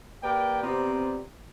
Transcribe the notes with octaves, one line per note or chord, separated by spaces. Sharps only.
A#3 G4 A#4 B4 D5 G5
C3 B3 C4 F4 D5 A#5